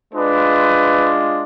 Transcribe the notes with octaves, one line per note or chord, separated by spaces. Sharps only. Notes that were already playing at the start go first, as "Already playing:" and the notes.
G#3 D4 F4 B4